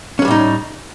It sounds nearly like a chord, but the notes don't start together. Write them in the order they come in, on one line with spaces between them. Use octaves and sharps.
C#4 G#3 G3 A2 D#4